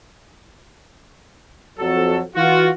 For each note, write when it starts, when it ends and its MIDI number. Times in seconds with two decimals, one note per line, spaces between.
1.79 2.20 41
1.79 2.20 54
1.79 2.20 66
1.79 2.20 69
2.35 2.68 52
2.35 2.68 65
2.35 2.68 66